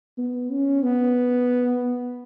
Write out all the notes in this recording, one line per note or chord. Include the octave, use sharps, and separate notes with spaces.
B3
C#4
B3